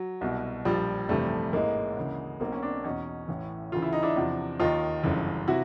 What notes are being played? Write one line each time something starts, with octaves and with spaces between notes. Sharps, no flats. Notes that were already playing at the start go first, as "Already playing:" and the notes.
Already playing: F#3
C2 B2
A#1 A#2 F3 G3
G1 F2 C3 E3 G3 A3
A1 G#2 E3 G#3 A#3
D2 C#3 E3
B1 B2 A#3 C4
C#4
C4 D4
E2 B2 C#4 D#4
A1 A2 E3
D2 C#3 E3 F4
E4
D#4
D4 E4
E2 C3 F3
D#2 D#3 D#4 F4
G1 F#2 C#3 E3
C3 E4 F#4